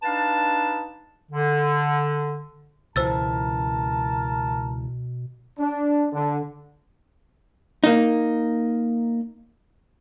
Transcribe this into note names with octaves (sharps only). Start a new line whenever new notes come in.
D4 D#4 B4 F5 A5
D3
C#2 B2 E3 A#4 C5 A5 E6 A6
D4
D3
A#3 D#4